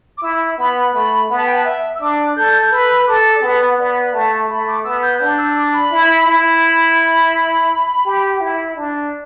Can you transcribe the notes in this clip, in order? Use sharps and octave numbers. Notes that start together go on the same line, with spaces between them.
D6
E4 E6
B3 B5
A3 B5
B3 B5
A5
G5
A5
E5
E6
D4 D6
A4 G6
G6
B4 E6
A4 D6
D5
B3 B4
B3 D5
A3 A5
A3 B5
D6
B3 E6
G6
D4 G6
E6
D6
B5
E4
E4
B5
B5
G4
E4
D4